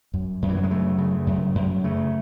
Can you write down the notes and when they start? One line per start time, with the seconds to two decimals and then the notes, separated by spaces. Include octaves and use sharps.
0.14 F#2
0.42 F#2
0.49 E3
0.57 F#3
0.63 G#3
0.71 C#3 A3
0.98 C#3
1.27 F#2
1.55 F#2
1.84 C#3 A3